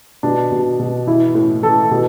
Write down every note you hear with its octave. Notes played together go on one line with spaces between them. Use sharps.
B2 D4
B2
B2
E3 E4
A2
E3 A4
B2